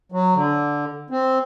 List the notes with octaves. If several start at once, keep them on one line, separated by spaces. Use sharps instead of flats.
F#3
D3
C4